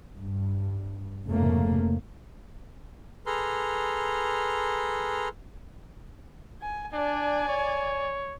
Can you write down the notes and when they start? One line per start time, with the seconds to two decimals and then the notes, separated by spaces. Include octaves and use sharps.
0.18 G2
1.27 F1 F2 G#2 C#3 A3 A#3
3.26 G#4 A4 B4 A#5 C6 F6
6.62 G#5
6.93 D4 D5 G#5
7.48 C#5